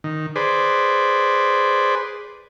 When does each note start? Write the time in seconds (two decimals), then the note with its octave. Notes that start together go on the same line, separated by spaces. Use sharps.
0.04 D#3
0.36 G#4 B4 C5 D5